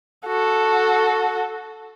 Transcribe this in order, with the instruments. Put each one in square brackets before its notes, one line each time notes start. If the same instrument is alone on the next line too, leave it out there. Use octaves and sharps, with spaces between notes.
[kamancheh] F#4 A4